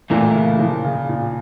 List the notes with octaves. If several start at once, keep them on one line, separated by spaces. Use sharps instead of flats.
A#2 E3 A3 E4 A#4
C#3
F3
C#3
A#2